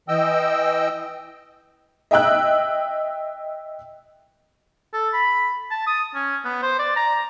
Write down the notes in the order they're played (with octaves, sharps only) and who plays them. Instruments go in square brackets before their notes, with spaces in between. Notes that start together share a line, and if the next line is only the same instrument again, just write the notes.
[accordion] E3 D#5 G5 E6
[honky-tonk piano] D#5 E5 G5 E6 F#6
[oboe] A4
B5
A5
D#6
C#4
B3
C5
D5
A#5